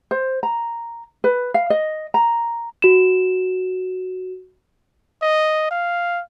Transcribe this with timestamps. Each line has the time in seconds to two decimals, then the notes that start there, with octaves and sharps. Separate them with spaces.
0.11 C5
0.43 A#5
1.24 B4
1.54 F5
1.70 D#5
2.14 A#5
2.82 F#4 E7
5.22 D#5
5.71 F5